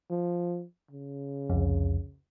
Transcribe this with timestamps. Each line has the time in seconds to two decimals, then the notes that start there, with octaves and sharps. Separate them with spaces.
0.10 F3
0.91 C#3
1.50 C2 F2